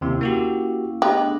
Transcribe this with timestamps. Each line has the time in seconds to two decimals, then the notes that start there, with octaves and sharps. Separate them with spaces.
0.01 D#2 C3 C#4 E4 F5
0.21 A#3 F#4 G4
1.02 A3 B3 D4 G4 G#4 D#5 F#6